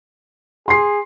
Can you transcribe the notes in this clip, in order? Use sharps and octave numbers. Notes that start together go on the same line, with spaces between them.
G#4 C6 C7